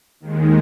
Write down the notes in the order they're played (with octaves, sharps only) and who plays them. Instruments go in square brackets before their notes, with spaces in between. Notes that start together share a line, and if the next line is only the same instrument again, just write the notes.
[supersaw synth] D#2 D#3 G#3